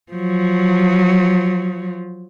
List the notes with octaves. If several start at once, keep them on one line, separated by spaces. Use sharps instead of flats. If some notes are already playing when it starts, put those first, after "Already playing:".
F3 F#3